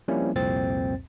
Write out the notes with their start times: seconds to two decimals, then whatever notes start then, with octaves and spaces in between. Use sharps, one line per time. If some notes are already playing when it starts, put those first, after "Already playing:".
0.08 F3 G3 A#3 C4 C#4 E4
0.36 C2 F2 A#2 C4 A6